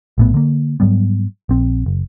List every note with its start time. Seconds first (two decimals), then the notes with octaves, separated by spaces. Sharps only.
0.18 A#1 A2 B3
0.34 D3 A#3
0.80 G#2 F#3 G3 B3
1.49 A#1 C4
1.86 F#1